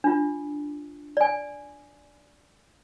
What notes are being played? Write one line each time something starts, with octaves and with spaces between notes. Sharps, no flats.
D4 F4
D5 G#5